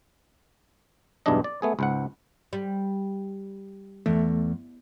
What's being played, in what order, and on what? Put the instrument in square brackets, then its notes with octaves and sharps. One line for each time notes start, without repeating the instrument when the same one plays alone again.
[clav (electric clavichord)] B1 E2 G2 E3 D4 D#5
D5
A3 B3 G#4
C#2 G#2 F#5
[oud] G3
[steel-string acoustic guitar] E2 [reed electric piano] A3